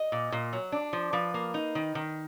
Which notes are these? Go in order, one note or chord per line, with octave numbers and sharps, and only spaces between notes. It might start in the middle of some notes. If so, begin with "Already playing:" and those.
Already playing: D#5
A#2
A#2
F#3
D4
F3
F3 B4
A#3
D#4
D#3
D#3